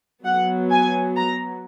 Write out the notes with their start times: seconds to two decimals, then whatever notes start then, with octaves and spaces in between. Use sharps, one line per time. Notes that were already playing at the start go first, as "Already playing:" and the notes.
0.25 F#3 B3 F#5
0.71 G#5
1.17 A#5